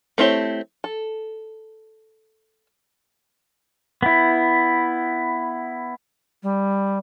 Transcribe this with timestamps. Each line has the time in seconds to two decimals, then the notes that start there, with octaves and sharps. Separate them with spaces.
0.18 A3 C4 E4 G4 C#5
0.84 A4
4.03 B3 E4
6.43 G3